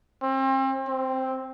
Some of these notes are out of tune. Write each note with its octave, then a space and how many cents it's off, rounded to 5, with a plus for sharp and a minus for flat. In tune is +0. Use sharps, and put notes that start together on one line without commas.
C4 +35
C4 +0